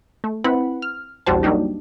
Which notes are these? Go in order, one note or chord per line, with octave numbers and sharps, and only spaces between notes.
A3
C4 E4 B4 F#5 B5
F6
A#1 E2 G3 F#4 C5 A5
F#3 G3 A#3 D4 D#4 G4